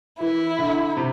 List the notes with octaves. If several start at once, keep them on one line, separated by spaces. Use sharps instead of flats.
E3 E4
D3
C3